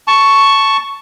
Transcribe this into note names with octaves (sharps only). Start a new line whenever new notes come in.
A5 C#6